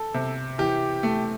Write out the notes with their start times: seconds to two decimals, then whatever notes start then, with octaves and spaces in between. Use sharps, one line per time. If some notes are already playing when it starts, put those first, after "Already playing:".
Already playing: A4
0.14 C3
0.58 E3 G4
1.03 A3